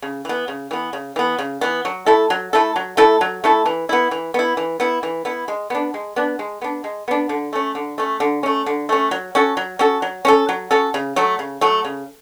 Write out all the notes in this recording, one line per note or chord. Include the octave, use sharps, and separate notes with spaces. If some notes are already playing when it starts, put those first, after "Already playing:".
C#3
E3 B3
C#3
E3 B3
C#3
E3 B3
C#3
E3 B3
F#3
A3 E4 A4
F#3
A3 E4 A4
F#3
A3 E4 A4
F#3
A3 E4 A4
E3
B3 E4
E3
B3 E4
E3
B3 E4
E3
B3 E4
G#3
B3 D4
G#3
B3 D4
G#3
B3 D4
G#3
B3 D4
D3
A3 C#4
D3
A3 C#4
D3
A3 C#4
D3
A3 C#4
F#3
C#4 F#4 A4
F#3
C#4 F#4 A4
F#3
C#4 F#4 A4
F#3
C#4 F#4 A4
C#3
F#3 A3
C#3
F#3 A3
C#3